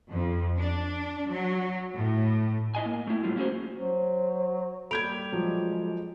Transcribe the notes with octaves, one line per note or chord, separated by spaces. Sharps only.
F2
D4
F#3
A2
E4 D#5 G#5
A#3
A3 E4
A2 G3 D#4 F4
A#3 C#4 F#4 G#4 C5
F#3 C5
G3 A#3 A4 B5 G6 G#6 D7 F7
F3 F#3 G#3